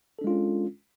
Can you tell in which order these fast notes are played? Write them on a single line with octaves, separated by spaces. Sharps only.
A4 D4 G#3 F4 C#4